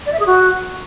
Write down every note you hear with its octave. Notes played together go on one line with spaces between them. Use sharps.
D5
E5
G#4
F#4